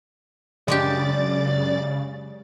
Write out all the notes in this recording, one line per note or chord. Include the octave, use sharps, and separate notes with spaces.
F#2 C#3 G#3 D4 G4 D5 A6